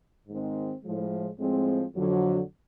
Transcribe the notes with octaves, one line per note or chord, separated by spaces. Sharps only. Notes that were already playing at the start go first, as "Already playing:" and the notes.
G#2 D#3 G#3 C4
A2 F3 G#3
A2 F3 G#3 C4
F2 D3 F#3